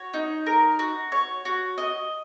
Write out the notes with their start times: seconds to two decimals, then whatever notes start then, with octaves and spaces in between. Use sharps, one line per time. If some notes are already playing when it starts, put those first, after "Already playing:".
Already playing: F#4 C#5
0.14 D#4
0.46 A#4
0.79 F#4
1.12 C#5
1.45 F#4
1.78 D#5